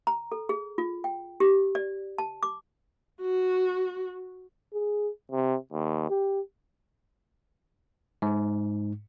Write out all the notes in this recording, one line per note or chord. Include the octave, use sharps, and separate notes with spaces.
A#5
A4
G#4
F4
G5
G4
D5
A5
D6
F#4
G#4
C3
D#2
G4
G#2